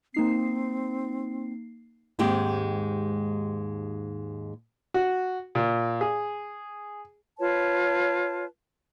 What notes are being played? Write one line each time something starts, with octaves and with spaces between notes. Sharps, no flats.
A#3 C4 D#4 C7
D#2 G#2 G#3 C4 G4
F#4
A#2
G#4
F4 B4 C#5 A5